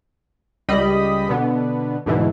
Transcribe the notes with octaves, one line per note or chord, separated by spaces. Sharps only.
C#2 G3 D#5 B5
B2 D3 B3
D2 G#2 B2 E3